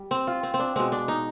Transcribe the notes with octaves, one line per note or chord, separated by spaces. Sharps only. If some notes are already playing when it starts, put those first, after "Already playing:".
Already playing: G3
C4
F4
C4
C4
D4
B2 G#3 C4
D4
D#4